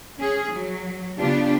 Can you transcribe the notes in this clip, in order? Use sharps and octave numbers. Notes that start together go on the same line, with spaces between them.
C#4 G#4
F#3
C#3 B3 D4 F4 G4